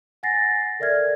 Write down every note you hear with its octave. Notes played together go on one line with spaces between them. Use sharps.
F#5 G#5 A6 A#6 C7
A4 A#4 D5 E5 F6 G#6